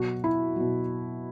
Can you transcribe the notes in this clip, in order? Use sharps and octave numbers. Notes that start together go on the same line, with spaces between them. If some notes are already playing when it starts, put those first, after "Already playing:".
Already playing: B2 F#3 F#4
E4
B2 F#3